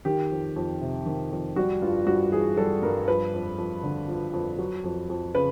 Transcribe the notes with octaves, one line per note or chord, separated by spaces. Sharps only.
D#3 G4
F2
F2
C3
D#3
F2
G3 F#4
G2 F4
G2 F#4
E3 G#4
G3 A4
G2 A#4
F3 B4
F2
F2
D3
F3
F2
F#3
F2
F2
C#3 B4